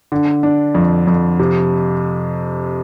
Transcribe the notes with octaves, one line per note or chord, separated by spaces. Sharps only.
D3
D4
F2
F2
C3